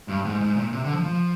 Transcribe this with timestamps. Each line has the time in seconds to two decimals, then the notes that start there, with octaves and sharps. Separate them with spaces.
0.08 G2
0.25 G#2
0.40 G#2
0.56 A#2
0.73 C3
0.84 D3
0.94 F3
1.04 F3